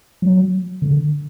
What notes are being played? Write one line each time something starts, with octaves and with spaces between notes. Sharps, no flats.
F#3
D3